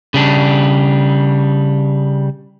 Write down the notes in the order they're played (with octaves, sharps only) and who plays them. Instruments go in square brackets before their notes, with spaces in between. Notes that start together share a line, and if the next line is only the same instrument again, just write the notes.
[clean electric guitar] C#3 G3 D4